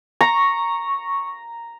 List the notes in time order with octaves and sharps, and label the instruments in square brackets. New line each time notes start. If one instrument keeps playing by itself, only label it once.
[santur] A#5 [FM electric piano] C#6